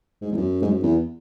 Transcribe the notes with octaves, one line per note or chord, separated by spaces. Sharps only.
G#2
E2
F#2
G#2
F#2
E2